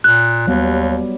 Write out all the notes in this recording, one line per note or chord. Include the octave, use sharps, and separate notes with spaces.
A#2 F#6
D#2 F#3 G3 B3